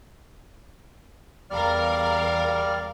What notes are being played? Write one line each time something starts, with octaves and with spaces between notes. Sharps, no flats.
E2 G3 A#4 D5 F5 F6